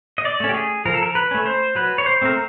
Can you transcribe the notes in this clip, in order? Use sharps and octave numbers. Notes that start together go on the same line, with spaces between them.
D#5
D5
A3 C#4
G4
G#4
F3 A#4
A4
A#4
B4
A3 C#4
C5
F#3 B4
C#5
C5
A3 C4 A#4